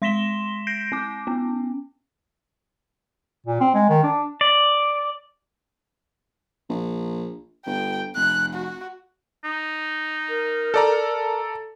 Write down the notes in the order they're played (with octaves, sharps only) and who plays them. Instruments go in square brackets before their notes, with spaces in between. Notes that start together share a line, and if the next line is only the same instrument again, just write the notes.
[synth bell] G#3 C6 A#6 B6 E7 G7
G6 A#6 C7 D7
C4 D6
B3 C#4
[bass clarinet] A#2
C4
G#3
D#3
D4
[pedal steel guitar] D5
[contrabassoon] A#1
[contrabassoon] G1 [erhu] G5
[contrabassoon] F1 [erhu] F#6
[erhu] F#4
[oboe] D#4
[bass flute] A#4
[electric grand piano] A4 D5 A#5